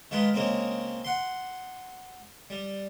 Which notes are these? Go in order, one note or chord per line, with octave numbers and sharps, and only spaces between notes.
D#3 G#3 F4 B4
C#3 G#3 A#3 C4
F#5 C6
G3